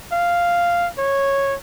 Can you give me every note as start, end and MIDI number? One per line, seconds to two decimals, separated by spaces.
0.13 0.88 77
0.98 1.55 73